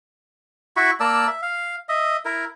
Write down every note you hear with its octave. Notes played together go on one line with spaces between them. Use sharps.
E4 F#4 B5 C#6
A#3 D5 A5 E6
E5
F5
D#5 E5
E4 A#4